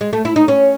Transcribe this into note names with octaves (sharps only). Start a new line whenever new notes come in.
G#3
A3
E4
D#4
C#4